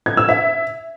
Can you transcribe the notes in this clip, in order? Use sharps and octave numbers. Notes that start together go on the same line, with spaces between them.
G#6
E6
E5